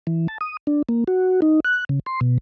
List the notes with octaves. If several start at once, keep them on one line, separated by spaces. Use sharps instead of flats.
E3
A5
D#6
D4
A#3
F#4
D#4
F#6
C#3
C6
B2